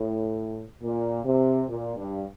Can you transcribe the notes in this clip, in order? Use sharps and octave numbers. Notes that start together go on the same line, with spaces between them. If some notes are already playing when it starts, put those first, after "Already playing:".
Already playing: A2
A#2
C3
A#2
G2